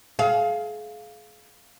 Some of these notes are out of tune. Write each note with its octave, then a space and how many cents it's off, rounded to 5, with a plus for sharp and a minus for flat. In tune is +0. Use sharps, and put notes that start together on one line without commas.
G#4 +35 F5 +0